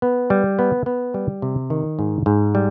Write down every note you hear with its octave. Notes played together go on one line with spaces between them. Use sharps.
B3
G3
B3
B3
G3
C3
D#3
G#2
G#2
G3